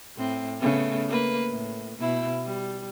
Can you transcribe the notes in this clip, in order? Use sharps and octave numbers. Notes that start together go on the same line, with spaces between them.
A2 C4
C#3 A3 B3
A#3 B4
A2
B2 E4
G3